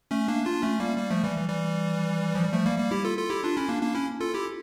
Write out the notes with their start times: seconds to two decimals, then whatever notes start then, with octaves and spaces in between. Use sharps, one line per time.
0.11 A3 C#4
0.28 A#3 D4
0.45 D4 F4
0.62 A3 C#4
0.80 G3 A#3
0.98 G3 A#3
1.10 F3 A3
1.24 E3 G3
1.36 E3
1.49 E3 G3
2.35 F3
2.44 G3
2.53 F3 A3
2.65 G3 A#3
2.78 G3 A#3
2.91 E4 G4
3.05 F4 A4
3.18 F4 A4
3.30 E4 G4
3.44 D4 F4
3.56 C#4 E4
3.69 A#3 D4
3.82 A#3 D4
3.95 C#4 E4
4.20 F4 A4
4.34 E4 G4